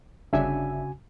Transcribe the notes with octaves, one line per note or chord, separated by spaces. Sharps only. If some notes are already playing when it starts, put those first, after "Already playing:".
G1 C#3 D4 F#4 E5 G#5